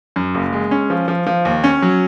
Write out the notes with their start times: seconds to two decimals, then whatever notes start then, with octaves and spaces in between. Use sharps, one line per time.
0.16 F#2
0.35 F#1
0.53 G#3
0.71 C#4
0.90 F3
1.08 F3
1.27 F3
1.45 D#2
1.64 C#4
1.82 F#3